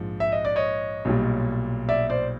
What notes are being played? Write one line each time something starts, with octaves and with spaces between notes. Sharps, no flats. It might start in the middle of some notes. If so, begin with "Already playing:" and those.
Already playing: A#1 G#2 F3
E5
D#5
D5
C#5 D#5
B1 A#2 G3
D5 E5
C5 D5